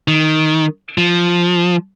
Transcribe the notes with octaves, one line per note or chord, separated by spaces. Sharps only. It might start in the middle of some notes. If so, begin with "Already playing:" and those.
D#3
F3